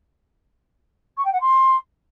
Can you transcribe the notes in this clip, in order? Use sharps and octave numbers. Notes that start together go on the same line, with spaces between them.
C#6
G5
F#5
C6